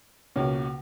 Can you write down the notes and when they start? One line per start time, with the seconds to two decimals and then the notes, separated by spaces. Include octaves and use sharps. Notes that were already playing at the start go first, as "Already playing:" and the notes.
0.36 C#2 B2 A#3 C#4